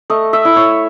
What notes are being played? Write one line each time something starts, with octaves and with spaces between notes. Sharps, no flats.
A3 D#5
E5
E4
C#5